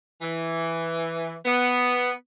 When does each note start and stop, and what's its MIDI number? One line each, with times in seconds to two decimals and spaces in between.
0.22 1.34 52
1.46 2.11 59